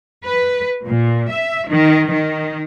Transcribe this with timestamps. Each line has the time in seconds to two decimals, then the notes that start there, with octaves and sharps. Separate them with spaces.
0.25 B4
0.86 A#2
1.32 E5
1.68 D#3
2.12 D#3